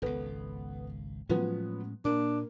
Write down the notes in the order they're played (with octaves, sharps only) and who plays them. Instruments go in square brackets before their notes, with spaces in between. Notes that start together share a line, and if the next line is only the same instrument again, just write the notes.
[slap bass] G#1 C#2 [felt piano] B3 A4
[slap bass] A2 G#3 C#4 [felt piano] F3 F#3 B3
[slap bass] A#2 [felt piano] A#3 [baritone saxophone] D4